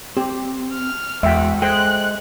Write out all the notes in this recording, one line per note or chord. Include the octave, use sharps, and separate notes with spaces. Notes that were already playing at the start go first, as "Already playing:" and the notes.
C4 G4
F6
E2 G#3 F#4 E5 G5
G#3 A4 C5 G5 F#6